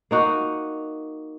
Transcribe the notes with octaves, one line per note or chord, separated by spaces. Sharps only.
A#3 D#4 F#4